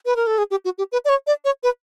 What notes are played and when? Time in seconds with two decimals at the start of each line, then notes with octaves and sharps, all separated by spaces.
0.06 B4
0.16 A#4
0.27 A4
0.38 G#4
0.51 G4
0.65 F#4
0.78 G4
0.92 B4
1.05 D5
1.09 C#5
1.27 D5
1.45 C#5
1.63 B4